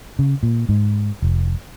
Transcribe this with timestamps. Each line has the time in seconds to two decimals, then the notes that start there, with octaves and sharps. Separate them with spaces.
0.19 C#3
0.43 A#2
0.69 G#2
1.22 F1